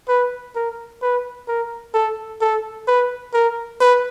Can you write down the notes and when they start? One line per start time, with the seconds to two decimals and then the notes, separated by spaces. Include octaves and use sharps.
0.08 B4
0.55 A#4
1.02 B4
1.48 A#4
1.94 A4
2.41 A4
2.88 B4
3.34 A#4
3.81 B4